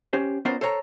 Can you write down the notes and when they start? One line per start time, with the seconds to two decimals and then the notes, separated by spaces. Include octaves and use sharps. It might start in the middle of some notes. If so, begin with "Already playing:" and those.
0.13 C#4 G4 C5
0.45 B3 C#4 F4 A#4 C5 D5
0.61 A4 C5 C#5 F5 A#5